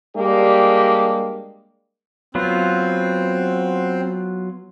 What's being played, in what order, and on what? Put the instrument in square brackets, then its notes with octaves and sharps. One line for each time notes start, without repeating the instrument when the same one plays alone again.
[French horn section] G3 G#3 A#3 D4 G4
[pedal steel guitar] F#3 B3 F4 [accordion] C4